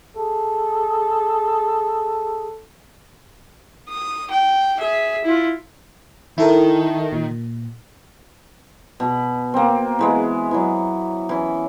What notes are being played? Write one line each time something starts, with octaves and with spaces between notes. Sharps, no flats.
G#4 A4
D#6
G5
G#4 E5
E4 F4
D#3 E4 A4 A#4
A#2
B2 B5
A#3 C4
E3 G#3 B3
E3 F#3
E3 C#4